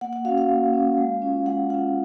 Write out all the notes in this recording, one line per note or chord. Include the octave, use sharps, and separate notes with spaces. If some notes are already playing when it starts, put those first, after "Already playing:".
A#3 F#5
F#5
C#4 F#4 F5
F5
A#3
C#4
F#4
G#3
C#4 F4
G#3 F#5
C#4 F4 F#5